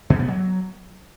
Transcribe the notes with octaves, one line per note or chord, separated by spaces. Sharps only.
B2
B3
F#3